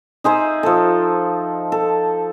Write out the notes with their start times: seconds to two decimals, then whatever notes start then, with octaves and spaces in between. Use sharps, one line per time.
0.24 D#4 G#4 C5 E5
0.63 F3 A4
1.72 A4